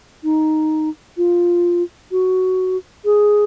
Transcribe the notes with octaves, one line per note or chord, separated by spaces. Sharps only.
D#4
F4
F#4
G#4